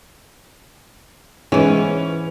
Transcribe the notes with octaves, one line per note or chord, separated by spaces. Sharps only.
G#2 E3 C#4 G#4 B4